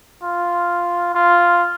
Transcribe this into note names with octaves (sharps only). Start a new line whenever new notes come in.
F4
F4